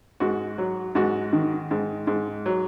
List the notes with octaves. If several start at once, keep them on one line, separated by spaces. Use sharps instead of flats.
G#2 F#4
F#3
G#2 F#4
D#3
G#2
G#2
F#3